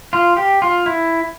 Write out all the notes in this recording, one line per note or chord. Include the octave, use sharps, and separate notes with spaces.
F4
G4
F4
E4